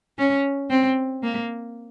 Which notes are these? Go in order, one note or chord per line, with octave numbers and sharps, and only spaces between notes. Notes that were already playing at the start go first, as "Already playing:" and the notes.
C#4
C4
A#3